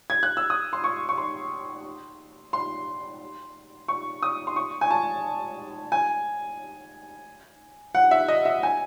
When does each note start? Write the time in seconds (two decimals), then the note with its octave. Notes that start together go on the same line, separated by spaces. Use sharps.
0.10 G#6
0.23 F#6
0.37 E6
0.50 D#6
0.73 C6
0.84 C#6
1.09 C#6
1.18 C6
2.53 C6
3.88 C#6
4.23 D#6
4.47 C6
4.56 C#6
4.81 G#5
4.91 A5
5.92 G#5
7.95 F#5
8.11 E5
8.28 D#5
8.45 E5
8.63 G#5